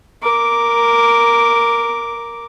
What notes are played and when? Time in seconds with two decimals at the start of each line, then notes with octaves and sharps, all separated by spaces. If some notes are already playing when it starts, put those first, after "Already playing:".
0.22 A#4 D6